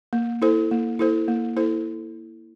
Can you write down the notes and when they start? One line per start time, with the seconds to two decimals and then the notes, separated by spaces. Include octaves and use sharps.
0.13 A#3
0.42 E4 A4 C5
0.71 A#3
0.99 E4 A4 C5
1.28 A#3
1.56 E4 A4 C5